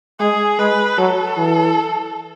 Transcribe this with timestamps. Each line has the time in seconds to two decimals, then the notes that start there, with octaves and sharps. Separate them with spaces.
0.20 G#3 G#4
0.59 G#3 B4
0.98 F#3 A4
1.37 E3